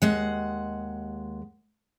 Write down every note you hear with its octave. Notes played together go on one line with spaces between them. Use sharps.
D#2 G#3 F#5